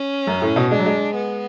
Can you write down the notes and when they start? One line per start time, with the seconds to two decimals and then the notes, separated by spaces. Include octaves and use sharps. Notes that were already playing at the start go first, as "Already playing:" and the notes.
Already playing: C#4
0.27 F#2
0.42 A2
0.56 B2
0.71 G#3 D4
0.79 F#3
0.86 G#3
1.16 B3